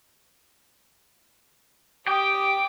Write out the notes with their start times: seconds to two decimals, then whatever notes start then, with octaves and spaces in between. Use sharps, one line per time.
2.07 G4 G5 D6 D#6